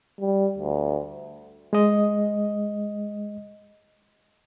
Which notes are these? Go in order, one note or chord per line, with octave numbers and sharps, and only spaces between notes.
G3
D2
G#3 D#5